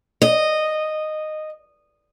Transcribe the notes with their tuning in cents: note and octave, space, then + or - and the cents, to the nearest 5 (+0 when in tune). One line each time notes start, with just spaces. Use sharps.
D#5 -10